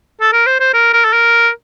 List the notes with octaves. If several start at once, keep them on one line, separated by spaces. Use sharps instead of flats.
A4
A#4
C5
C5
A#4
A#4
A4
A#4